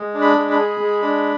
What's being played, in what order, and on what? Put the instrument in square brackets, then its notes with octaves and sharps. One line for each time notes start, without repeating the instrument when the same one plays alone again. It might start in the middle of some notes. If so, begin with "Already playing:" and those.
Already playing: [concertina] G#3
D4
B5
G#3
B5
G#4
G#3
D4